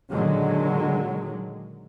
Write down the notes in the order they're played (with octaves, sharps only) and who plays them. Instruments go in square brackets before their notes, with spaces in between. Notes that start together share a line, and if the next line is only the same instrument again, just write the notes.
[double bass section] A#2 D3 D#3 F#3 G#3